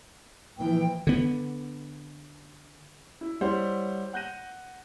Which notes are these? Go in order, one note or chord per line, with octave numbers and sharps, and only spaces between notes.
A#2 E3 F3 G5
D3 B3
E4
G3 E4 C5 C#5 F#5
F#5 F#6 G6 A#6 D#7